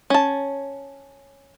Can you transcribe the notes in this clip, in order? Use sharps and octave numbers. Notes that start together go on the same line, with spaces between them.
C#4 A5